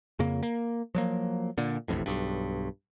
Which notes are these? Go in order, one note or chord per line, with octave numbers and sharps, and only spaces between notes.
F2 C#3 A#3
A#3
F3 F#3 A#3
A#2 D3
E1 A1 F2 A2
B1 G2